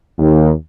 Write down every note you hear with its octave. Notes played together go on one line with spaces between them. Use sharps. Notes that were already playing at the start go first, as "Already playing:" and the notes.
D#2